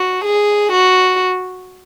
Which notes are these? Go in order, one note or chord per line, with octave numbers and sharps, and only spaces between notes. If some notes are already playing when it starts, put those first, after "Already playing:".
Already playing: F#4
G#4
F#4